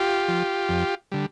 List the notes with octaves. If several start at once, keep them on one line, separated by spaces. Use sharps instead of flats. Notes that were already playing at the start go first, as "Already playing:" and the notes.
Already playing: F4 G4
F3
F2
D3 G3